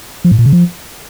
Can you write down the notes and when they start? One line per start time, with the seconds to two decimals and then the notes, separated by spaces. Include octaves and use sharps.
0.25 F3
0.32 A2
0.39 A#2
0.46 C#3
0.53 F3